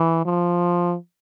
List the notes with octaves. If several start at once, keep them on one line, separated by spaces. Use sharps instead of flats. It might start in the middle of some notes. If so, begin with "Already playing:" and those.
Already playing: E3
F3